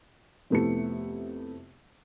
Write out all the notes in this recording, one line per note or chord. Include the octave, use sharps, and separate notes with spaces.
F2 C3 A3 B3 E4 C#7